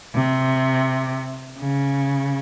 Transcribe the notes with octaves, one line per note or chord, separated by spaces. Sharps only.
C3
C#3